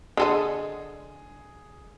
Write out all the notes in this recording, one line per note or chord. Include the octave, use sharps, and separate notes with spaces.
D3 G#4 A4 D#5